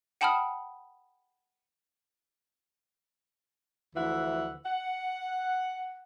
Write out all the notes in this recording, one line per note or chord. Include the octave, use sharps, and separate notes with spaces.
F#5 G5 A5 B5 D#6 F6
D2 E3 F3 E5 F#5
F#5